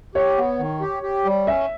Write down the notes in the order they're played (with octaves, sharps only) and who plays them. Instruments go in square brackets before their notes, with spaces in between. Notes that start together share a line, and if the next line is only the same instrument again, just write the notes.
[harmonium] G4 [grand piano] C#5
[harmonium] B3
D#3
G4
G4
G3
[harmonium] C#4 [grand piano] E5